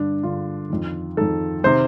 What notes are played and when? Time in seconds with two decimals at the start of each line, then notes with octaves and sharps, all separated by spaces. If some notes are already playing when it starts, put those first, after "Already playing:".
Already playing: G2 D3 D4
0.23 G2 D3 F4
0.70 F2 D#3
1.17 F2 D#3 A4
1.64 C3 D#3 C5